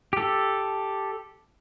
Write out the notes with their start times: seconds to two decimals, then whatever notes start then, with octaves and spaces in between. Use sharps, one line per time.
0.13 G4 A4